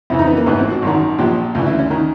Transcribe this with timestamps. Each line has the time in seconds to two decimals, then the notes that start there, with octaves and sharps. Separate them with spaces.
0.10 F2 C#3 E3 E4
0.19 D#4
0.27 B3
0.37 A#3
0.46 A1 G#2 E3 B3
0.59 C4
0.70 F#4
0.82 G#1 F#2 D#3
1.19 A#1 A#2 F3 G4
1.54 D2 C#3 E3 F4
1.67 E4
1.79 C#4
1.90 D#3 C#4